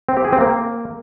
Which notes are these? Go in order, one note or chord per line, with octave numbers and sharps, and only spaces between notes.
C4
G4
G#4
C4
A#3